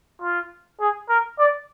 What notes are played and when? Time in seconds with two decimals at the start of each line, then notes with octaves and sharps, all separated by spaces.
0.22 F4
0.80 G#4
1.09 A#4
1.38 D5